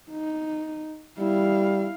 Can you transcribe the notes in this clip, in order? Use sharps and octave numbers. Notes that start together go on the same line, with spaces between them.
D#4
G3 E4 F5